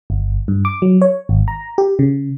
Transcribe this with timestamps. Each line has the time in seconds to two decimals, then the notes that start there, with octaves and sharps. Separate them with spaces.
0.10 G1
0.48 G2
0.65 D6
0.82 F#3
1.02 C#5
1.29 G#1
1.48 A#5
1.78 G4
1.99 C#3